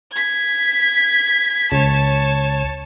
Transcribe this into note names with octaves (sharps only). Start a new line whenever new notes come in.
G#6 B6
C#2 C#5 A5